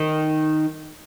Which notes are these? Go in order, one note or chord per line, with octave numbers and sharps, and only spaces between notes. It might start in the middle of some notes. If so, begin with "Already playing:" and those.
Already playing: D#3